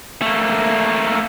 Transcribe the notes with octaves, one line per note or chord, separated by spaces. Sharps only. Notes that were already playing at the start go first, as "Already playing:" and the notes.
A3 A#3